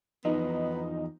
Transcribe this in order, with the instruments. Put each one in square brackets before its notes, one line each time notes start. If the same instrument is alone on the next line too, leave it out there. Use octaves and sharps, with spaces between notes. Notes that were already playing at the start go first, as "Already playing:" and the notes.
[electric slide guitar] E2 F3 [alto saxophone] B3 [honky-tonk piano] D#4